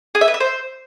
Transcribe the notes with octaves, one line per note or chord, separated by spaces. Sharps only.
G#4
E5
B4
E5
C5